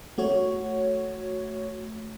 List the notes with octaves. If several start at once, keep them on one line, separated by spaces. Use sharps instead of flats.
A3 F#4 C#5